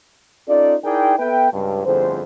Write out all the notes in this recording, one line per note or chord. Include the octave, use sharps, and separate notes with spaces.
C#4 D#4 F4 A4 D5
D#4 E4 G#4 A#4 D5 G5
B3 A4 B4 E5 G5
C#2 G2
G1 F2 A2 D3 G#4 C5